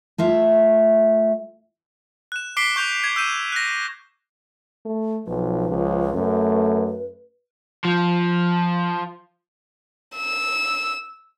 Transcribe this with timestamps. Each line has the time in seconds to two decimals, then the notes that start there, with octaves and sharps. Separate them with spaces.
0.18 A3 F4 E5
2.32 F#6 E7
2.57 D6 B6 C7 D7 G7
2.76 C#6 G6 F7
3.04 G#6
3.16 E6 G6 D#7 E7
3.52 F#6 A#6
4.86 A3
5.27 B1 F3 B4
5.68 C#2
6.14 F#2 A3
7.85 F3
10.17 E6